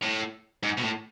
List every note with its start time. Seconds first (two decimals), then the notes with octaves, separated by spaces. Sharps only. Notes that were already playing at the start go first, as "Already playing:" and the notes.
0.03 A2
0.63 G#2
0.78 B2
0.83 A2